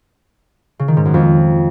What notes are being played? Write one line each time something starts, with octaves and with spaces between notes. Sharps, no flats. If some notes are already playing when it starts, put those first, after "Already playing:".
C#3
D#3
G#2
F#2
F2